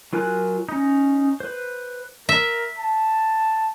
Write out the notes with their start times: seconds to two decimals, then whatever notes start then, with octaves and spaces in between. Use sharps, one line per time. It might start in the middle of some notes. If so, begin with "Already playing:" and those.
0.13 F#3 F4 A#4 G#5 F#6
0.69 C#4 D#4
1.40 B4 C5
2.29 A#4 E5
2.78 A5